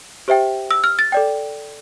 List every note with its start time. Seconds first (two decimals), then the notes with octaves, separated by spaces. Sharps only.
0.28 G4 C5 E5 G5
0.71 E6
0.84 F6
0.99 A6
1.12 A4 D5 G5